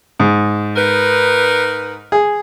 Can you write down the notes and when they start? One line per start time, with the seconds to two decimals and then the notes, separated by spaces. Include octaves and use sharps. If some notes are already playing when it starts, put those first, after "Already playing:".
0.20 G#2
0.76 D#4 A#4 B4
2.12 G#4